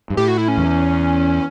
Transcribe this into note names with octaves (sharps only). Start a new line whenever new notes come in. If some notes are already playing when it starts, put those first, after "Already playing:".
G2
A2 G4
F#4
E4
C#4
E2